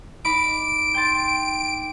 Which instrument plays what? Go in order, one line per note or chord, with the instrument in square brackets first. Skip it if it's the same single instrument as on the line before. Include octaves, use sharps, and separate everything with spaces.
[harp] D#4 B5 D6 [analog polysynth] D7
[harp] G5 C6 A6